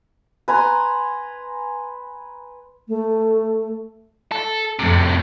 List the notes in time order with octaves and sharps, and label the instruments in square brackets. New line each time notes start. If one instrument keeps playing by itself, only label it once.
[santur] B4 G#5 A#5 C6
[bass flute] A3
[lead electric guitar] A4
[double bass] F2 A3 [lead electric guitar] A2 C3